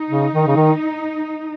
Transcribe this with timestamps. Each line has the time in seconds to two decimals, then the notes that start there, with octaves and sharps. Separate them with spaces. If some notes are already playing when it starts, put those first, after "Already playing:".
Already playing: D#4
0.11 C#3
0.34 D#3
0.47 C#3
0.56 D#3